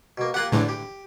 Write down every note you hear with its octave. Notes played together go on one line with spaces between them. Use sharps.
B2 A#3
A#3 F4 G4 F#5 F#6
E2 A2 D3 E3 D4
G4